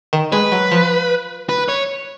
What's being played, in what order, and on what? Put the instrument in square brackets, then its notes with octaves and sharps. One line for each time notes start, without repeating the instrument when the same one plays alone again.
[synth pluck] D#3
[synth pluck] G#3 [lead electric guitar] B4
[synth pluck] F#3
F3
[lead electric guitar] B4
C#5